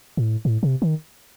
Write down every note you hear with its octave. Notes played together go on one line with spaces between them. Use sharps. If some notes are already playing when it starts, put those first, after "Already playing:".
A2
A2
C3
D#3